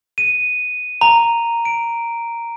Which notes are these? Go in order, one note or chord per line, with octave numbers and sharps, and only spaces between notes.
D#7
A#5
D7